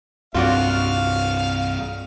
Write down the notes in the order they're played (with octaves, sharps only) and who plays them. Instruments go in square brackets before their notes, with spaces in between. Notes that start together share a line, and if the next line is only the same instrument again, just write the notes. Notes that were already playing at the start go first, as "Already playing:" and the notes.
[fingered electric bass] C2 G2 C4 [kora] F4 F#4 D5 [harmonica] F5